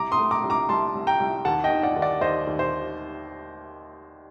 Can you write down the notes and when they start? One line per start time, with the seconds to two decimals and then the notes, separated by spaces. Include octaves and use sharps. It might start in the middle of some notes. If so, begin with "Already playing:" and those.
Already playing: C2 A#5 D6
0.12 C6 D#6
0.18 A3
0.31 A#5 D6
0.43 C2
0.50 A#5 D6
0.69 C2 A5 C6
0.95 C2
1.07 G5 A#5
1.20 C2
1.45 D#2 F#5 A5
1.64 D#5 G5
1.70 D#3
1.83 D5 F#5
1.96 D#2
2.02 D5 F#5
2.21 D#2 C5 D#5
2.47 D#2
2.59 C5